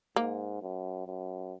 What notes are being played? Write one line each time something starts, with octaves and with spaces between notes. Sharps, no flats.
G#2 A#3
F#2
F#2